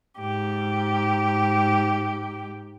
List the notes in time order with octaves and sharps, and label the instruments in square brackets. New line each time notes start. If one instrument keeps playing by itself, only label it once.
[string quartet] G#2 G4